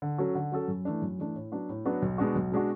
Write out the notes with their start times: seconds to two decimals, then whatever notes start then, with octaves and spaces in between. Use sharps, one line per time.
0.02 D3
0.18 F#3 C#4 F#4 A4
0.35 D3
0.52 F#3 C#4 F#4 A4
0.68 F#2
0.85 E3 A3 D4
1.02 F#2
1.19 E3 A3 D4
1.35 A2
1.52 F#3 B3 D4 F#4
1.69 A2
1.85 F#3 B3 D4 F#4
2.02 B1
2.18 B2 G#3 D4 F#4
2.35 B1
2.52 B2 G#3 D4 F#4